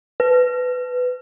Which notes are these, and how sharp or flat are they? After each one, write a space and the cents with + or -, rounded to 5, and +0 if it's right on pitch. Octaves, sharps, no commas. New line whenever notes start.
B4 +15